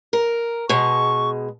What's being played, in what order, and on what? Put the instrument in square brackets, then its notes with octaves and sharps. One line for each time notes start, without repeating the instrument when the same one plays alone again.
[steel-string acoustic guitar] A#4
[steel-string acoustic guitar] B2 G#3 [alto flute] C#6